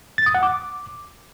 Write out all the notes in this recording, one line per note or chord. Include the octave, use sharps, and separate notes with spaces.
A6
D#6
F#5
D6